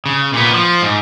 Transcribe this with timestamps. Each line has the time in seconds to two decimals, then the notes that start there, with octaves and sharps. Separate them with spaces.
0.06 C#3
0.33 A#2 B3
0.53 F3
0.82 G#2